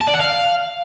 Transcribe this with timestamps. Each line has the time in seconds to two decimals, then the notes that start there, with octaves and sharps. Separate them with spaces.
0.01 A5
0.08 D5
0.14 F#5
0.20 F5